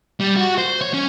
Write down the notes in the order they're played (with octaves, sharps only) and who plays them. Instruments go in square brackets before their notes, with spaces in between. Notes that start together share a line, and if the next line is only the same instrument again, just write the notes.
[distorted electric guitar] G3
F#4
C5
C#5
C#4